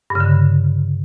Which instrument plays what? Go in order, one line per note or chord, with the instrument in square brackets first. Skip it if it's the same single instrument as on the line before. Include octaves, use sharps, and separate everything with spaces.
[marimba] G2
C#3
D3